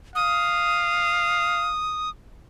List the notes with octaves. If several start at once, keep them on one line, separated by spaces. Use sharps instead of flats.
F5 D#6